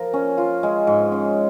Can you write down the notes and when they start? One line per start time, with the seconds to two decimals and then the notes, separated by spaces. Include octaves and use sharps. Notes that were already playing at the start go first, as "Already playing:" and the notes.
Already playing: F3 A#4
0.13 C#4
0.38 F4
0.63 G#3
0.87 G#2
1.12 C#4